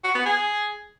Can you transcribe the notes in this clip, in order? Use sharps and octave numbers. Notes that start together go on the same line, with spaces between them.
F#4
B3
G#4